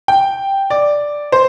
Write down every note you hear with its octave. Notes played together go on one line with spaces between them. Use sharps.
G5
D5
C5